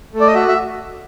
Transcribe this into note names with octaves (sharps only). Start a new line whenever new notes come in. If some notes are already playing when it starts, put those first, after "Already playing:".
A3
D5
D#5
F#4 E5
E5